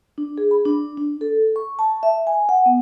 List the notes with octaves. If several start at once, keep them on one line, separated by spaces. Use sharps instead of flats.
D4
G#4
B5
D4
D4
A4
C#6
A5
E5
G#5
F#5
B3